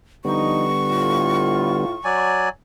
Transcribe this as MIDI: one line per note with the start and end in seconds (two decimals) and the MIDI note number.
0.25 1.85 50
0.25 0.64 53
0.25 1.85 55
0.25 1.85 59
0.25 0.64 63
0.25 2.23 85
0.88 1.95 45
0.88 1.95 65
2.04 2.49 54
2.04 2.49 74
2.04 2.49 80